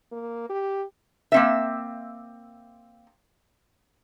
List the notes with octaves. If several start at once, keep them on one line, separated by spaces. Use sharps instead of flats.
A#3
G4
A#3 C4 E5